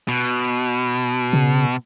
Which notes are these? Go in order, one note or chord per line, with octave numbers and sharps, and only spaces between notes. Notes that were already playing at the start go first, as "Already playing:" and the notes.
B2
C#3